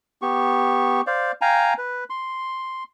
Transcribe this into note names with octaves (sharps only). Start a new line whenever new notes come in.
B3 G4 C#6
C5 D5 F5
F5 G5 G#5 A#5
B4
C6